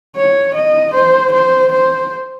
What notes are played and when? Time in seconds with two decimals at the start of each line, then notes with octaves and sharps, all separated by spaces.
0.16 C#5
0.55 D#5
0.94 C5
1.33 C5
1.73 C5